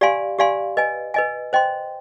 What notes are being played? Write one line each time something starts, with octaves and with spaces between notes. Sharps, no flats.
G4 D5 F5 G#5 C6
G4 D5 F5 G#5 C6
B4 D#5 G#5
B4 D#5 G#5
C5 D#5 G5 C6